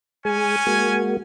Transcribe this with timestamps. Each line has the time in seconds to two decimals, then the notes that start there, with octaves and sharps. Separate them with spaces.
0.25 G#3 C#4 G#4 G#5
0.67 G#3 A#3 F#4